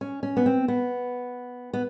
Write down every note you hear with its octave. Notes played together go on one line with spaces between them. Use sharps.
C#4
C#4
B3
C4
B3
B3